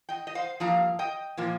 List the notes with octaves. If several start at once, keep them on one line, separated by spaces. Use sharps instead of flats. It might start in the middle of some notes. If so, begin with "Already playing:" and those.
D#5 G5
D#5
C5 F5
G2 F3 A#3 F5 A#5
D#5 G5
A#2 F3 A#3